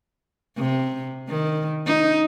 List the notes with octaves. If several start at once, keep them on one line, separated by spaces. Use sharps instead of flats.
C3
D#3
D#4